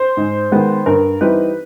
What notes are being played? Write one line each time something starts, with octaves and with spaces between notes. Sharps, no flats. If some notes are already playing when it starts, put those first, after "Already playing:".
Already playing: C5
G#2
D#3 G#3 B3
G2 A#4
E3 G3 C4 D#4 B4